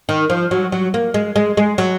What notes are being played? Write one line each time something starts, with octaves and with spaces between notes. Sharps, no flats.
D#3
F3
F#3
F#3
A#3
G#3
G#3
G#3
F#3